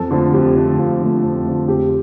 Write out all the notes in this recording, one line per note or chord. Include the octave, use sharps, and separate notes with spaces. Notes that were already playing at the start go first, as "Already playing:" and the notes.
Already playing: F2 A4
D3 F3 A3
F2 G4
D3 F3 A3
F2 F4
D3 F3 A3
F2
D3 F3 A3
F2 G4